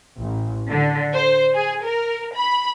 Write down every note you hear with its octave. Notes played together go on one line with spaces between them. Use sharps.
A1
D3
C5
G#4
A#4
B5